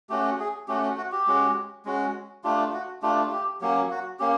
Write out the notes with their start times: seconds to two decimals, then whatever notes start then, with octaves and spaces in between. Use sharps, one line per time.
0.09 A3 C#4 F#4 G4
0.40 G#4
0.68 A3 C#4 F#4 G4
0.84 F#4
0.97 F#4
1.12 G4
1.27 G#3 C#4 F#4
1.85 G#3 C#4 F#4
2.44 A3 D4 F4 G4
2.74 F#4
3.02 A3 D4 F4 G4
3.32 G4
3.61 F#3 A#3 C#4 G4
3.91 F#4
4.19 A#3 C#4 G4